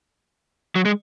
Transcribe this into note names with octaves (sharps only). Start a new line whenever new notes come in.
F#3
G#3